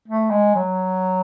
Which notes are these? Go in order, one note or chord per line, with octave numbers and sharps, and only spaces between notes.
A3
G#3
F#3